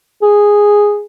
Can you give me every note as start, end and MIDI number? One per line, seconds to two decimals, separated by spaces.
0.22 1.02 68